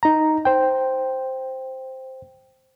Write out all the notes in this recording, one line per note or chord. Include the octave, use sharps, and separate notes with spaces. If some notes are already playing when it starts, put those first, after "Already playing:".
D#4 A#5
C5 G5